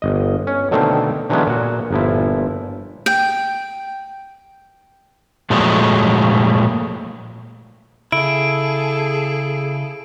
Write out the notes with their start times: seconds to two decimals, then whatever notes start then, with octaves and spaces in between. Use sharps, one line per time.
0.02 G1 D#5
0.47 C#4
0.71 B2 D3 D#3 A3 A#3 C4
1.30 D3 E3 F#3 G#3 B3 C#4
1.47 A#2 F#4
1.91 G1 A#2 F3 E4
3.06 G5
5.50 A#2 F3 F#3 G#3 A3
8.12 C#3 E4 G#4 A4 D7